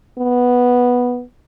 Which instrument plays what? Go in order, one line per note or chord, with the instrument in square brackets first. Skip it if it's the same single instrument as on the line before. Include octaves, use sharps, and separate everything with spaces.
[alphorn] B3